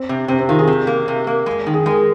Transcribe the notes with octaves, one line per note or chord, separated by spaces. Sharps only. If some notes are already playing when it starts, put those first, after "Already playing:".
Already playing: C4
C3
C3 C4
C4
D#3 F4
G#4
C3
A#3
C3
A#3
G#3
D#3
G#4
G#3 A#4